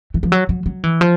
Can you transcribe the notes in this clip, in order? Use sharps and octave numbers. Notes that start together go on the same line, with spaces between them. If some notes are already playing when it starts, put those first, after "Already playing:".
E3
F3
F#3
F#3
F#3
E3
F3